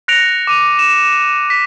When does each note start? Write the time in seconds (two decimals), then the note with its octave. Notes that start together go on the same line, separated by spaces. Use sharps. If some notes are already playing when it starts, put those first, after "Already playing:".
0.08 F#6 A#6 C#7 D7 F7
0.47 D6 D#7 F7
0.79 E7
1.50 B6